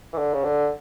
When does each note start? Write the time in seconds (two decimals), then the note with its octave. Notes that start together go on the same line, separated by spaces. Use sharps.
0.13 E3
0.18 D3
0.34 C#3
0.44 D3